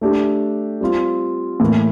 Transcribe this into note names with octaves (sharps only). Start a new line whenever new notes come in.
A3 D4 G4
G3 C4 F4
A2 E3 A#3